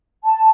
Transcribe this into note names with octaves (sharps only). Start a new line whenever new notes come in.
A5